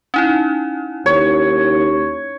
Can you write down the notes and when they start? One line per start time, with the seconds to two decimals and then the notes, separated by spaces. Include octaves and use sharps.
0.14 C#4 D#4 E4
1.06 D#2 C#5